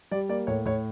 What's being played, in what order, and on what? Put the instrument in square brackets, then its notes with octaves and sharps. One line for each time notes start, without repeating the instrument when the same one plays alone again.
[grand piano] G3 D5
A#3 D5
A2 C#5
A2 C#5